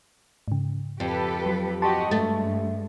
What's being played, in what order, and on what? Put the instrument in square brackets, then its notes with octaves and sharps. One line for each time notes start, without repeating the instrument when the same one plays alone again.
[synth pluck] G#2 C#3
[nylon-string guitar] F2 [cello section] G4 A4 B4
[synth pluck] F#3
[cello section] F#4 G4 D#5 [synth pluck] A5 C6
[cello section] G2 G#3 [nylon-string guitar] A3 [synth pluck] A6